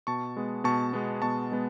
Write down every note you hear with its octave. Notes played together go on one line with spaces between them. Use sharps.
B2 A5 C#6
G#3 B3
B2 A5 C#6
G#3 B3
B2 A5 C#6
G#3 B3